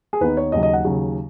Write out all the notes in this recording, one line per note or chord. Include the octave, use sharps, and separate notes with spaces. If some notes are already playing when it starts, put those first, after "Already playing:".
G#4
D#2 D#3 B3 D#4 B4
C#5
D#2 C#3 F#3 D#5
D#5
F#5
D#2 C#3 F#3